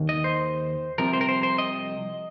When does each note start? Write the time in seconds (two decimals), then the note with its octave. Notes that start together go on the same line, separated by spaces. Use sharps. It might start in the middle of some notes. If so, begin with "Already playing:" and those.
Already playing: D#2 D#3
0.09 D#5
0.24 C5
0.98 C2 C3 F3 A#4
1.13 C5
1.21 A#4
1.29 C5
1.43 C5
1.58 D#5